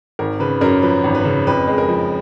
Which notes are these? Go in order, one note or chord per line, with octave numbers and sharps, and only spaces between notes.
G#1 A#4
C#3 B4
F#2 A#4
F3 B4
G#1
B4
C#3
F2 B4
G#3
A#4
F3